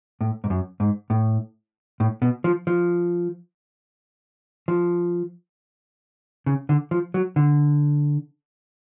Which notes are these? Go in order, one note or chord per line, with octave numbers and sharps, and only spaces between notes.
A2
G#2
F#2
G#2
A2
A2
B2
F3
F3
F3
C#3
D3
F3
F#3
D3